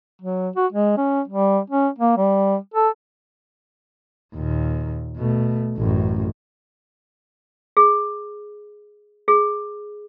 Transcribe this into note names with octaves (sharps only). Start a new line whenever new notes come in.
F#3
F#4
G#3
C#4
G3
C#4
A#3
G3
A4
D#2 A#2
B2 A3
A1 F#2
G#4
G#4